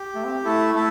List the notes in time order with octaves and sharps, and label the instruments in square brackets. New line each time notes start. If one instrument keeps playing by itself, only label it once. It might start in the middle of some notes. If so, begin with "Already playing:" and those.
Already playing: [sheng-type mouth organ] G4
[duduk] A3
C4
[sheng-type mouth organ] A3 A4 [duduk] E4
[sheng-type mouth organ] A3 A4